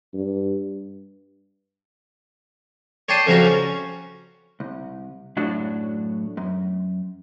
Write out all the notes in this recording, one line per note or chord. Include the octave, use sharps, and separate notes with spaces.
G2
C#5 D5 G5 A5 C6 D#6
F2 C#3 F3 G3 F#4 A#5
C#4
C2
F#2 A2 F#3 D4 F#4
F#2